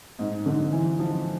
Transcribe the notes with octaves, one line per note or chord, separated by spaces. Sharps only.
G#2
D3
E3
F3